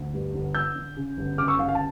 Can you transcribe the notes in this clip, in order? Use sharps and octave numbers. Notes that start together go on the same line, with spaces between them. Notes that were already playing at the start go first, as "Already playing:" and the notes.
Already playing: D2
G2
G1
D3 E6 G6
D3
C#3
G1
C#3 D6 F6
C#6 E6
G1 F5
F5
A5